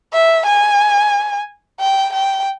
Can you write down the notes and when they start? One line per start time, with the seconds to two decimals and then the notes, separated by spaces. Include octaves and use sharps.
0.13 E5
0.46 G#5
1.80 G5
2.13 G5